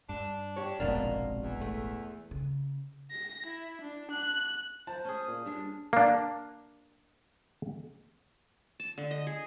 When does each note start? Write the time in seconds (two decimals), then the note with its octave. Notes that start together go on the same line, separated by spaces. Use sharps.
0.09 G2 D4
0.56 G4 C#5
0.80 F1 A#1 F2 G#2 B2 A#3 D4
1.43 E2
1.61 A3
2.31 C#3
3.11 A#6
3.46 E4
3.81 D4
4.11 F#6
4.87 C5 A5
5.05 C#4 G#4
5.28 A#2
5.46 G2 D4
5.93 A#3 D4
8.80 A5
8.98 D3
9.11 D#5
9.27 G#4